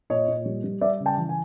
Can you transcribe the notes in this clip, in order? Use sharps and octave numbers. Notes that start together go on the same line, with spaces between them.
A#2 C#5 D#5
A#2
G3
G3
G3 D5 E5
C#3
G5 A5
E3
G#5